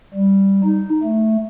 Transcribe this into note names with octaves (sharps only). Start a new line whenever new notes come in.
G3
D#4
A3